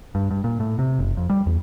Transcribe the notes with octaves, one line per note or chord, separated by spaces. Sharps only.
G2
G2
A#2
A2
C3
F#1
F2
G3
E2